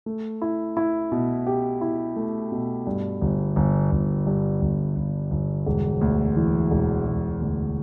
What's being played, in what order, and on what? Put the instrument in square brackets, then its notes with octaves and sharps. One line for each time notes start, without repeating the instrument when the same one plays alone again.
[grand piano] A3
E4
E4
B2
G4
E4
A3
B2
G2
G1
G1
G1
G2
G1
G1
G1
E1
D2
E3
E1
E1
D2